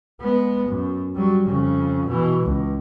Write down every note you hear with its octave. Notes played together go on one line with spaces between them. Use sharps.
G#3 B3
F#2
F#3 G3
F2 C#3
B2 E3
C#2